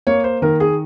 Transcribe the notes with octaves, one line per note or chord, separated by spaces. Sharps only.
A#3 C#5
C5
D#3 A#4
G#4